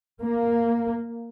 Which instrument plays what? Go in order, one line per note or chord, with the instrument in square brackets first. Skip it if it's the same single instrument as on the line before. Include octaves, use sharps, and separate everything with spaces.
[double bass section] A#3